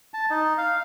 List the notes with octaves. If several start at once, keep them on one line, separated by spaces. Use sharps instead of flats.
A5
D#4
F5